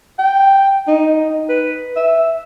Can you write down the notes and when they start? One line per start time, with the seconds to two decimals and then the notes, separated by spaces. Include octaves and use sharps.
0.19 G5
0.88 D#4
1.49 B4
1.96 E5